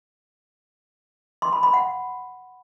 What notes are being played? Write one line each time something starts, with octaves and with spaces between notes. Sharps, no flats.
C6
B5
B5
F#5